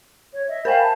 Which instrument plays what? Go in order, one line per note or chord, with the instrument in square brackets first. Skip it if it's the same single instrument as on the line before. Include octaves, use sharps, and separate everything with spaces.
[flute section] C#5
D#5 E5
[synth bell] A#4 C5 G5 [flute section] F5 G#5 B5
[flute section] A5